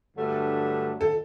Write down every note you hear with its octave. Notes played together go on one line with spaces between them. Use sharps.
G2 D3 F#3 A3 D4
A4